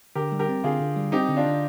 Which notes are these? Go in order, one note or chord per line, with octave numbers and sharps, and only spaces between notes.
D3 G4 A#4
G3
G4 A#4
C4
D3 F4 G#4
D3
G3
C4 D#4 G4
D3
D4 F4
D3